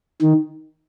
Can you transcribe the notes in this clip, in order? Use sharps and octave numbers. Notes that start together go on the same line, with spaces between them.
D#3